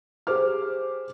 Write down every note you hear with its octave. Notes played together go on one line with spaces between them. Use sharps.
G4 G#4 C5 D6 F6